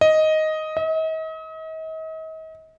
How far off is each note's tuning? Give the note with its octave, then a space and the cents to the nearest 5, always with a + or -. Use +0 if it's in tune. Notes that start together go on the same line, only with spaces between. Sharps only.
D#5 +5
D#5 +40